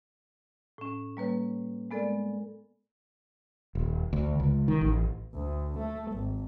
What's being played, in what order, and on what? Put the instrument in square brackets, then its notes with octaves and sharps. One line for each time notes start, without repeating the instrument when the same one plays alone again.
[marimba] A2 C#4
G3 A#3 B4 C#5
G#3 B3 A4 A#4 D5
[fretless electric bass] D#1
D2
C#2
D#3
A1
[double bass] D2
A3
G#1